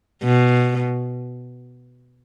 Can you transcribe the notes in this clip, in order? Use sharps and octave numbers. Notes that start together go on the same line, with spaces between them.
B2